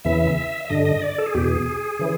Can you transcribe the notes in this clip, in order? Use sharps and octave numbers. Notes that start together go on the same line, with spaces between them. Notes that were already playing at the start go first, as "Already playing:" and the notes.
E2 C#3 E3 E5
E5
G2 D3 D#5
D#5
D5
A4
G#4
E2 B2 G4
G#4
C#3 E3